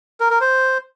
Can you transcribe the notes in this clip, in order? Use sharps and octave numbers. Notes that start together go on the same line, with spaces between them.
A#4
A#4
C5